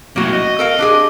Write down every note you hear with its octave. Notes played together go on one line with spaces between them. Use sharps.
F#2 A2 A#3 F#4
D#5
A4 A#4 F5
D4 G4 G#4